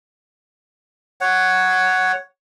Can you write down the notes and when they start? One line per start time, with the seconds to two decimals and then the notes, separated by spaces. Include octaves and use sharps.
1.21 C#5 F#5